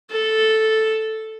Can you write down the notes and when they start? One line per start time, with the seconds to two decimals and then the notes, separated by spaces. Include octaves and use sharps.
0.11 A4